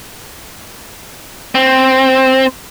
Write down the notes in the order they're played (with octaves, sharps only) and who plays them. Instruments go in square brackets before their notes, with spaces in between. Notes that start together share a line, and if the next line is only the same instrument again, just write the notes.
[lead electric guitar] C4